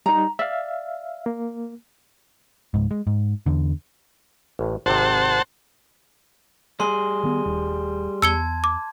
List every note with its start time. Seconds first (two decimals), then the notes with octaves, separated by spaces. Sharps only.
0.06 G3 D#4 A#5
0.39 D5 E5 F5
1.26 A#3
2.74 C#2 G#2
2.91 G#3
3.07 G#2
3.46 E2 D3
4.59 A1 A2
4.86 G#1 C3 C5 F#5 A5
6.80 G3 G#4 C6 G7
7.23 D#3 B3
7.46 D#1
8.22 E2 A5 E6 G#6 C#7 G7
8.64 D6